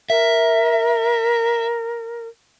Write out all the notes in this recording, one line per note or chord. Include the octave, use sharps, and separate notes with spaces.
A#4 E5